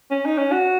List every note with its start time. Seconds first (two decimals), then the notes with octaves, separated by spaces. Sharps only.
0.11 C#4
0.25 D#4
0.38 C#4
0.52 F#4